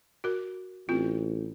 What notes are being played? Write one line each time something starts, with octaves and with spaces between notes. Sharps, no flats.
F#4 A#4
A1 C4 F4